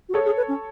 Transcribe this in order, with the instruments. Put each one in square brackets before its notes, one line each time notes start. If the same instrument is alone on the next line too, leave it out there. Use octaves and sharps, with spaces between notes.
[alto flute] F#4
[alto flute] G#4 [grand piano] A4 C#5
[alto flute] G#4
B4
C#4